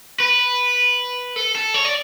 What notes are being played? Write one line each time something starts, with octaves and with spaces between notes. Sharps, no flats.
B4
A4
A4
C#5
D5